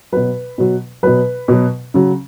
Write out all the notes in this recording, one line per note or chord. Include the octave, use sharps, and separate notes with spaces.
B2 F#3 B4
B2 F#3
B2 F#3 B4
B2 F#3
C#3 F#3